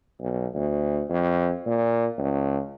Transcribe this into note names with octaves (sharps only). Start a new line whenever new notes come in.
B1
D2
F2
A#2
C#2